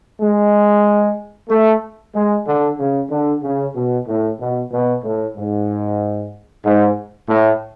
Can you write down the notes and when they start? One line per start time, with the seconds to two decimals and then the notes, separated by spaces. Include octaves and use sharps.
0.21 G#3
1.49 A3
2.14 G#3
2.46 D3
2.78 C#3
3.10 D3
3.43 C#3
3.75 B2
4.07 A2
4.39 B2
4.71 B2
5.03 A2
5.36 G#2
6.65 G#2
7.29 A2